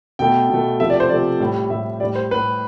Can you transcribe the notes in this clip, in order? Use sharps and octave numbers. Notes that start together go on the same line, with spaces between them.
B2 A3 G5
B2 A3
C3 F3 A3 E5
D5
C5
C3 F3 A3 D5
A2 G3
A2 G3 E5
A2 G3 D5
C5
A2 G3 B4